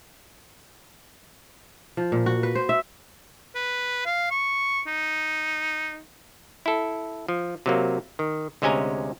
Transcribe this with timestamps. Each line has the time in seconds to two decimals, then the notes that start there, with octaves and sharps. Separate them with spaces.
1.97 F3
2.12 A#2
2.26 F#4
2.43 B4
2.55 C5
2.69 E5
3.55 B4
4.06 F5
4.31 C#6
4.87 D#4
6.66 E4 A4
7.28 F3
7.66 C3 F#3 A#3
8.19 D#3
8.62 D2 C3 G#3 C#4 G#5 A#5